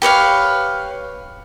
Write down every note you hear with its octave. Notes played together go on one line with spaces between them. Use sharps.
G4 B4 C#5 F5